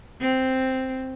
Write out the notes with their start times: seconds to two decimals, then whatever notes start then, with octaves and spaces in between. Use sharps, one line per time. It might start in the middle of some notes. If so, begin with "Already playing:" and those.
0.21 C4